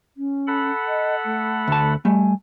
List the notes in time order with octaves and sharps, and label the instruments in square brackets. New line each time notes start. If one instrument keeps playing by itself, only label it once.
[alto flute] C#4
[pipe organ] A4 F#5 B5
[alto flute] D#5
A3
[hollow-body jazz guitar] D2 A5
[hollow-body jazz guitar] G3 A3 [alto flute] G#5